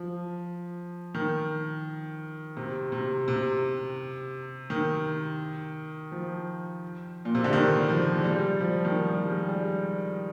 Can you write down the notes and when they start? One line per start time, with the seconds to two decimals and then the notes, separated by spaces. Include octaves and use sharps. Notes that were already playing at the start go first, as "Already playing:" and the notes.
Already playing: F3
1.15 D#3
2.57 C3
2.92 C3
3.28 C3
4.70 D#3
6.12 F3
7.25 A#2
7.35 C3
7.44 D3
7.53 D#3
7.89 F3
8.18 G#3
8.24 G3
8.60 F3
8.85 D#3
8.95 F3
9.13 G3
9.31 G#3
9.49 G3